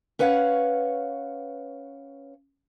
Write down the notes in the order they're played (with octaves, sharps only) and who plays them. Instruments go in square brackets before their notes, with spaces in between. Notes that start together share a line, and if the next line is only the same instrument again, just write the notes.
[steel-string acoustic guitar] C#4 B4 C#5 F5 F#5